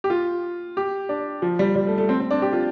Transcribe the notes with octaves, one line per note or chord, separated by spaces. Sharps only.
G4
F4
G4
D4
F3
G3
G3
A3
A3
C4
C4
D4
G4
F4